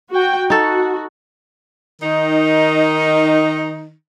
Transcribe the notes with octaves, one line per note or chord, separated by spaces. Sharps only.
F#4 G5
D#4 F#4 A4
D#3 D#4